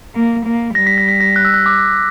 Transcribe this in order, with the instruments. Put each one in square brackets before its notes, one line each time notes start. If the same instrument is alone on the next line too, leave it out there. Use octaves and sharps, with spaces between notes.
[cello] A#3
A#3
[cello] G3 [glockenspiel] A#6
[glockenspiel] B6
A#6
B6
A#6
F#6
E6
F#6
D6